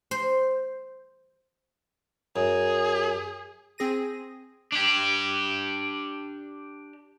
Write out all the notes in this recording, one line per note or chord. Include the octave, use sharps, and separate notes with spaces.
C5
F#2 G#4
C4 G#4 A#6 D#7
D4 G4